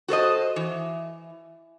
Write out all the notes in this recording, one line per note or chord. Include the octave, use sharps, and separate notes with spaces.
F#4 A4 C5 D#5
E3